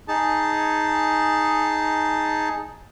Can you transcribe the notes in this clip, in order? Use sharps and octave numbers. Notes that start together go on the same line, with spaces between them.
D#4 G#4 A5